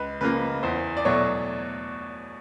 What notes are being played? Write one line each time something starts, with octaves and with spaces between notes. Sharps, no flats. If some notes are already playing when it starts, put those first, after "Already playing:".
Already playing: C#2 B4
C#3 F3 A#3 B4
E2 C5
D5
B2 F#3 A3 C#5